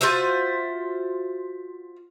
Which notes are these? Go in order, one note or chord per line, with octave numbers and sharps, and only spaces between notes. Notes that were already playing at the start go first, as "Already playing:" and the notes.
F4 F#4 C5 E5